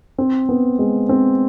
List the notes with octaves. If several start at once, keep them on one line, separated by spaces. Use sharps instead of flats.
C4
B3
G#3
C4